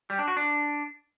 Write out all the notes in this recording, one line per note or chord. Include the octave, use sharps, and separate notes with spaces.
G3
D4
F#4
D4